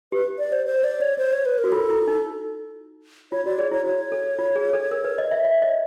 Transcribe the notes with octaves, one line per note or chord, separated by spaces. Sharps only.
G4 B4
D5
C5
C5
D5
C#5
C5
C#5
B4
A#4
F#4
F4 A4
E4
D#4
F4 C#5
F#4 D5
G#4 C#5
E4 C#5
F#4 C#5
A4
F4
G#4
A4
A#4
B4
D#5
E5
E5
D#5